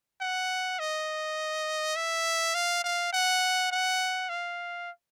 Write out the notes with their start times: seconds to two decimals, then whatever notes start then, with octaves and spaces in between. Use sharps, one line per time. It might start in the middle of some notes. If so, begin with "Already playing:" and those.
0.21 F#5
0.79 D#5
1.96 E5
2.54 F5
2.84 F5
3.13 F#5
3.71 F#5
4.29 F5